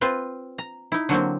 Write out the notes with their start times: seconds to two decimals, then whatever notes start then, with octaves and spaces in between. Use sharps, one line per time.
0.01 C4 F4 B4
0.58 A#5
0.92 D#4 E4
1.09 D3 F#3 A#3 C4